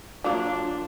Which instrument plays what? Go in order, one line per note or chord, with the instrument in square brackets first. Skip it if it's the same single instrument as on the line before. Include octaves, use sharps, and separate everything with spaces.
[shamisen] F#3 A#3 [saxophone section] D4 [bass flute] F4